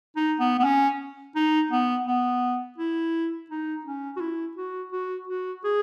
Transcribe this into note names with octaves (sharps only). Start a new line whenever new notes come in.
D#4
B3
B3
C#4
D#4
B3
B3
E4
D#4
C#4
F#4
E4
F#4
F#4
F#4
G#4